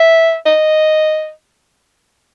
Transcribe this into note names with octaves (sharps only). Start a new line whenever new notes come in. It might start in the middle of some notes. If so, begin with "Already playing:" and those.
Already playing: E5
D#5